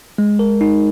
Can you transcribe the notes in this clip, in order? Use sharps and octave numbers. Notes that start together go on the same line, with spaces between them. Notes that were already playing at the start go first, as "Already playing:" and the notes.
G#3
A#4
D#4